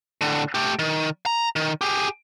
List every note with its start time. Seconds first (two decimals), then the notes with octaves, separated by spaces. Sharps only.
0.21 A2 D3
0.54 A3 G4
0.79 D#3
1.26 A#5
1.56 D#3
1.81 G4 G#4